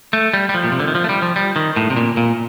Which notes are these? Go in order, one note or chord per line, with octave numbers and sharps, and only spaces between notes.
A3
G3
G3
F3
A#2
C3
D3
D#3
F3
A3
G3
F3
G3
D#3
A2
C3
A#2
A#2